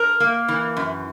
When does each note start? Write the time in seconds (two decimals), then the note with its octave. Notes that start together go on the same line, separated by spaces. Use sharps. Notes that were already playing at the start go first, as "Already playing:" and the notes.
Already playing: A#4
0.20 A#3
0.48 E3
0.77 F#2